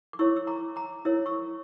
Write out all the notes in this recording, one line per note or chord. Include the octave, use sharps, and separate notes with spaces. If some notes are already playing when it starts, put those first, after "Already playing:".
D6
E4 A#4 C#5 C#6 E6
E6
A#5 D6
A#5 D6
E4 A#4 C#5 E6
C#6 E6